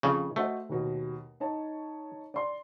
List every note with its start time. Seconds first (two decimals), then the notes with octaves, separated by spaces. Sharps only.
0.03 F2 C#3
0.36 A3 F#4 C5 D#5
0.69 D#2 B2
1.40 D#4 C#5 A5
2.34 D5 C6